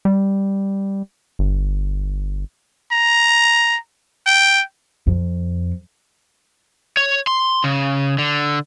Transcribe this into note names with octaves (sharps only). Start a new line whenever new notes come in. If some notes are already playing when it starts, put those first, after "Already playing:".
G3
G1
A#5
G5
F2
C#5
C6
C#3
D3